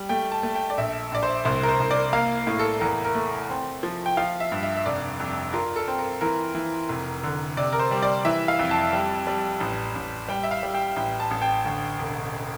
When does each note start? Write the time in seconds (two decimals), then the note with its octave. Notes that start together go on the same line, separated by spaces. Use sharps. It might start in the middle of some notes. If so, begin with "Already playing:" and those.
Already playing: G3
0.09 A3 G5
0.32 A5
0.43 A3
0.55 G5
0.70 D5
0.78 A#1 E5
1.12 A#1 D5
1.23 C5
1.45 C2 C5
1.63 A#4
1.69 C5
1.80 C2
1.91 D5
2.13 A#3 F5
2.47 A2
2.59 A4
2.81 E2 A#4
3.05 A#4
3.15 A3
3.50 C4
3.83 F3
4.06 G5
4.17 F3 F5
4.40 E5
4.52 G2
4.63 E5
4.77 E5
4.86 F1 D5
5.20 F2
5.53 F4 A#4
5.76 A4
5.88 C4
5.99 A#4
6.21 E3 A#4
6.55 E3
6.89 F1
7.23 D3
7.57 C3 D5
7.73 A#4
7.79 C5
7.91 G3
8.03 D5
8.25 E3 E5
8.48 F5
8.59 F2
8.71 A5
8.93 G3
9.27 G3
9.61 A1
9.96 A1
10.28 G3 G5
10.43 E5
10.51 F5
10.63 G3
10.74 G5
10.96 A1 G5
11.20 A5
11.31 A1
11.42 G5
11.65 D2
11.99 E1